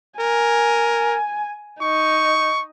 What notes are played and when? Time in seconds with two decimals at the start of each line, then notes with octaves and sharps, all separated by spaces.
0.20 A#4 G#5
1.81 D#4 C#6